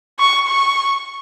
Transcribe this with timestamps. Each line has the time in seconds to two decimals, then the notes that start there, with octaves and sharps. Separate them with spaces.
0.19 C#6
0.47 C#6